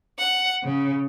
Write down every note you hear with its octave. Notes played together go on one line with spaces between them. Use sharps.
F#5
C#3